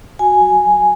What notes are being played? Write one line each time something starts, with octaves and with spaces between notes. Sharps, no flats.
F#4 G#5
F#3